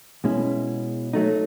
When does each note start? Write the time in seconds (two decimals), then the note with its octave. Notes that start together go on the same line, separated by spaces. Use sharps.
0.24 B2 G#3 C#4 E4
1.13 F#3 A3 D#4